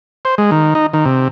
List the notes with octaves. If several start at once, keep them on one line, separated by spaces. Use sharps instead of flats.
C5
G#3
D#3
D#4
D#3
C3